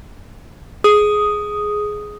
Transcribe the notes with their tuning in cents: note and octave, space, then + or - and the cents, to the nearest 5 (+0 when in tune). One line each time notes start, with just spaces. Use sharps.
G#4 +10 D#6 +0